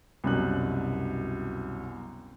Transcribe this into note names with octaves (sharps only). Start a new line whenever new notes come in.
C2 F#2 B2 F#6